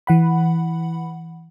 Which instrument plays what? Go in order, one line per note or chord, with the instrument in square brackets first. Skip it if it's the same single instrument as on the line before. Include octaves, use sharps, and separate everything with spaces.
[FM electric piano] E3 F#5 B5